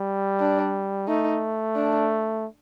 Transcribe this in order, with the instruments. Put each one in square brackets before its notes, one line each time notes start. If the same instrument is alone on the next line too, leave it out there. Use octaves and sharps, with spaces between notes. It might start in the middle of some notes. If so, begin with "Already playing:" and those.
Already playing: [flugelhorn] G3
[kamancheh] D4
[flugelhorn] A3 [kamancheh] D#4
[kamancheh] D4